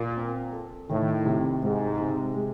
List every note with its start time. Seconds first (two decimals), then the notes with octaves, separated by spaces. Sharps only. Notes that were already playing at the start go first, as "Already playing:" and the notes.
Already playing: A#2
0.17 C4
0.53 A4
0.89 A2 D#3
1.25 C3
1.62 G#2 G#3
1.99 C3
2.34 G#3